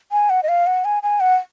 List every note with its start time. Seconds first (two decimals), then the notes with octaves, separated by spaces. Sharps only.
0.12 G#5
0.30 F#5
0.43 D#5
0.49 F5
0.67 F#5
0.85 G#5
1.03 G#5
1.20 F#5